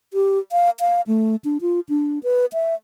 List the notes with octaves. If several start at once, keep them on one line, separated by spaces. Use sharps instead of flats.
G4
F5
F5
A3
D4
F4
D4
B4
E5